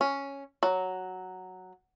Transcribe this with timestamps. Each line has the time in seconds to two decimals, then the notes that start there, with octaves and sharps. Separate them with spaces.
0.01 C#4
0.63 F#3